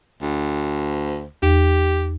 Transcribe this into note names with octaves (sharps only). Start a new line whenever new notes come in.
D2
E2 G4